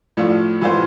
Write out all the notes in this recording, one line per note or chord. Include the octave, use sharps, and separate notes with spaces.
A2 F3 A3 D4 F4
A2 E3 B3 F4 C5